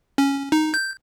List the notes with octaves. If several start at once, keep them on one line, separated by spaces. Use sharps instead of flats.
C#4
D#4
G6